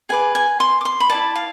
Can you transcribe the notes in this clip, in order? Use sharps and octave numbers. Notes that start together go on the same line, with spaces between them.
G#4 B4 D5 G#5
G#5
C6
D6
C6
B5
E4 G#4 D5 A5
F5